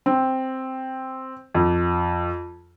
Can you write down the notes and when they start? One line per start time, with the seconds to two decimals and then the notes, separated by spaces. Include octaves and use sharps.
0.06 C4
1.54 F2